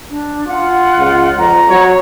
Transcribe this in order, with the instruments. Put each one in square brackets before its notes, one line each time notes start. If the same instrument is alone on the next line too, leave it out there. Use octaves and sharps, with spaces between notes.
[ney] D4
[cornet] F4 [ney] F#5
[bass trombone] C#2
[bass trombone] F2 [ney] A#5
[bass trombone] F#3 [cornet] C#5